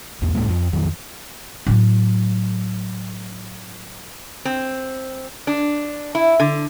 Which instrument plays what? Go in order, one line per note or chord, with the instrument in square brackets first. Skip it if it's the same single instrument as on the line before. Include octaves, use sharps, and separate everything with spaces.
[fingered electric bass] B1 E2 B3
D2 A2 G#3 A#3
F2 F3
F2 D#3 F#3
[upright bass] A2 F#3
[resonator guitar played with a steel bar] C4
D4
E4
D3